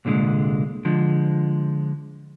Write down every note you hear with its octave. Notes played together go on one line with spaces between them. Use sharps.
C2 A#2 D3 G3 G#3
D3 F3 G#3